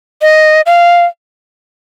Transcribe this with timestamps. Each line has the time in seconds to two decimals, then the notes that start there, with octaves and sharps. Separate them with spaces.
0.22 D#5
0.66 F5